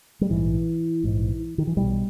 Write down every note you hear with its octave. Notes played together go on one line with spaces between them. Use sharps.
G3
A#1 G#2 E3
A#1 G#2
D#3
E3
B1 B2 G3